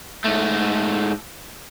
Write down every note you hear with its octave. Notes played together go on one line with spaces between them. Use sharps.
G#2 A3